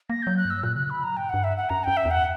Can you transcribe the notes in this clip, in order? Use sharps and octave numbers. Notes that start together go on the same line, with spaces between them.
A#3 A#6
F#3 G6
F#6
G2
E6
A#2 F#6
C#3 F#6
D3 B5
F#3 A#5
G2 G5
G2 F#5
E5
F#5
F#2 A#5
F#2 G5
E5
E2
F#5